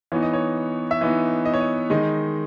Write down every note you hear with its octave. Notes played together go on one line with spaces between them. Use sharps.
E3 B3 D#4 C#5
D#5
C#5
E5
E3 B3 D#4 D#5
D#5
C#5
D#5
D#3 G#3 D#4 D#5